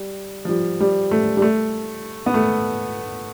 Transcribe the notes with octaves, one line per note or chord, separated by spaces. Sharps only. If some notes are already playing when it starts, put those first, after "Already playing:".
Already playing: G3
F3
G3
G3
A3
G3
A3
B3
A3